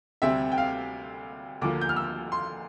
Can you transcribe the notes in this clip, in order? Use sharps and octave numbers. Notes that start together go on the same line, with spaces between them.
D2 C3 G3 C4 E5
G5
F5
D2 D3 F3 A#3 D6
G6
F6
E6
C6